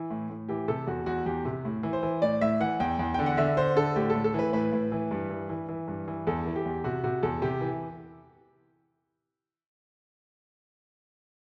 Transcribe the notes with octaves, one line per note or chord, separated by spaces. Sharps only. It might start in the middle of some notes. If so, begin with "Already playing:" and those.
Already playing: E3
A2
A2
E3 G4
C3 A4
E2 F#4
E2 F#4
E2 G4
C3
A2
E3
C5
E3
A2 D5
A2 E5
E3 F#5
E2 G5
E2
D3 G5
F#5
D3 E5
D3 C5
D3 A4
A2 G4
A4
A2
A4
E3 B4
A2 B4
A2
E3
G2
E3
E3
E3
G2
E3
E2 A4
E3
G4
E2
C3 F#4
C3 F#4
E2 A4
C3 G4
E3